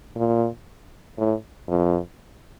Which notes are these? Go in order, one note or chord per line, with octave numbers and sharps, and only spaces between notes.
A#2
A2
F2